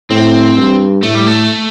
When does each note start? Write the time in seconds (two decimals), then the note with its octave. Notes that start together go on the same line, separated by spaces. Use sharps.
0.10 A2 C4
0.57 G2
1.03 A2 A3
1.15 G3
1.27 A3